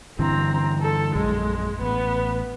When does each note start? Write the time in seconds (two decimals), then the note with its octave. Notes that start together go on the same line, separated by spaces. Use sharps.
0.19 G2 D3 E3 C4 A#5
0.81 A4
1.16 A#1 F#2 G#3
1.82 A1 B3